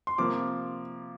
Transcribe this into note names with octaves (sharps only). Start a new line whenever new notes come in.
C6
C3 F3 A#3 D6